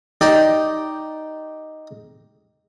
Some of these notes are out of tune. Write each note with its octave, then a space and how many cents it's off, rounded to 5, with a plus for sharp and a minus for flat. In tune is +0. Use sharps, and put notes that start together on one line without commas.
D#4 +0 G4 +0 D5 +0